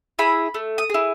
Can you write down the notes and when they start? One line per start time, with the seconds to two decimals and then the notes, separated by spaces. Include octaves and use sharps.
0.19 E4 G#4 B5
0.54 A3
0.78 D#6
0.90 E4 G#4